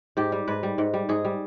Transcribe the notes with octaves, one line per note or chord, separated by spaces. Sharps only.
G#2 G4
G3
G#2 B4
G3
G#2
G3
G#2 G#4
G3